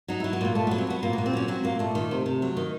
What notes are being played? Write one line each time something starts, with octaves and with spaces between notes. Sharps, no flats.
F#3 D#4
F#3 E4
B3
A#2 A#3
A#2 A3
F#3 B3
C4
F#3 B3
A#2 A#3
B3
A#2
C4
F#3 C#4
F#3 C4
A#2 A#3
A#2 A3
D#3
C3
C3
F#3
D#3